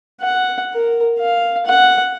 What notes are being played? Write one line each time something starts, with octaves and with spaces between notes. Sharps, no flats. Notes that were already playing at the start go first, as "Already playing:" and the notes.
F#5
A#4
F5
F#5